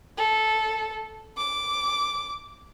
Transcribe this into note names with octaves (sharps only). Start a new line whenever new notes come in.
A4
D6